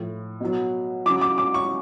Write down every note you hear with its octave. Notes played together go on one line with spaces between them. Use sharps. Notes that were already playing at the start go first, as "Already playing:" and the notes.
Already playing: A2 F3
B2 F#3
C#3 F#3 D6
D6
D6
C#6